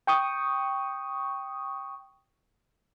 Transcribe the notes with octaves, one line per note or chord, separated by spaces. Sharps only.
G5 C#6 D#6